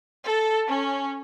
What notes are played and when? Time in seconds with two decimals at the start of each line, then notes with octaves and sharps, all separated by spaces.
0.27 A4
0.68 C#4